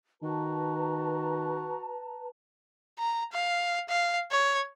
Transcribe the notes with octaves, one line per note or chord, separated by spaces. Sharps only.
D#3 F#4 B4 A5 A#5
A#5
F5
F5
C#5